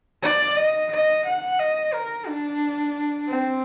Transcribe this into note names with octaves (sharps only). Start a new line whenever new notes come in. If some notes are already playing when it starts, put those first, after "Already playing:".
D5
D#5
D#5
F#5
D#5
A#4
D4
C4